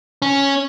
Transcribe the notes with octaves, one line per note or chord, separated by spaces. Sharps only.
C#4